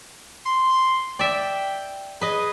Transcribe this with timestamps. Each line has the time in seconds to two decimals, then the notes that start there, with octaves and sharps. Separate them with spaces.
0.46 C6
1.19 D5 E5 G5
2.21 G#4 B4 D#5